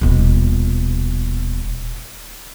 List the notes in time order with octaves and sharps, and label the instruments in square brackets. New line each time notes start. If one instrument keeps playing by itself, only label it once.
[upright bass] D#1 B2